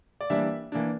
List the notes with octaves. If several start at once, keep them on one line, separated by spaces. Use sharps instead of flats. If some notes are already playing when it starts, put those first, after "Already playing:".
D5
E3 G3 A#3 D4 E5
E3 A#3 D4